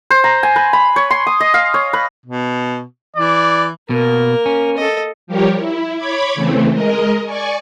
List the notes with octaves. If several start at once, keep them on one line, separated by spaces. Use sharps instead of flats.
C5
A#5
G#5
B4
B5
C#5
C6
D#6
D#5
F5
C#5
B4
B2
E3 D5
B2 A#3 A#4
C#4
A4 D#5
F3 G3 G4 A#4 C#5
E4
C#5 B5 D6 G#6
C#3 E3 A3 C4
G#3 A#4 D#5
D5 G#5 C#6